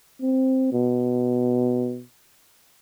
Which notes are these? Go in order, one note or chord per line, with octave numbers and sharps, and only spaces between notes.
C4
B2